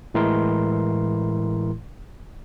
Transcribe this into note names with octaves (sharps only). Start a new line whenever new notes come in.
A2 E3 G#3 E4 A#4 C6